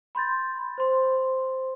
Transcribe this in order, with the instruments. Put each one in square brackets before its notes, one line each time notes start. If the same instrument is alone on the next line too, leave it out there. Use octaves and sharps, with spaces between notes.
[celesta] B5 C6 G6 A6
C5 C6